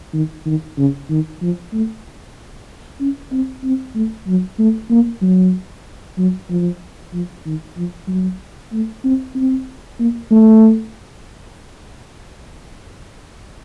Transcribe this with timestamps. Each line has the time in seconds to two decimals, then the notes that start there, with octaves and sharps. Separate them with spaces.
0.14 D#3
0.46 D#3
0.78 C#3
1.10 D#3
1.42 F3
1.73 A3
3.00 C#4
3.32 C4
3.64 C4
3.95 A3
4.27 F#3
4.59 A3
4.90 A#3
5.22 F#3
6.18 F#3
6.50 F3
7.13 F3
7.46 D#3
7.77 F3
8.08 F#3
8.73 A3
9.04 C4
9.35 C4
10.00 A#3
10.31 A3